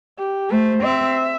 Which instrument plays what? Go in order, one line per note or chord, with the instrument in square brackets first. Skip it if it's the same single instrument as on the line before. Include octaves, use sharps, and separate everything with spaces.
[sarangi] G4
[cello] A3 [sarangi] C5
[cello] C4 [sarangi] E5